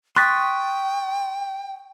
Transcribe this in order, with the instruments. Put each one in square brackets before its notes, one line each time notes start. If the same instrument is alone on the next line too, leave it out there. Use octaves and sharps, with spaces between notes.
[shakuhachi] G5 [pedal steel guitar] C6 C#6 D#6 [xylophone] F#6 A6 B6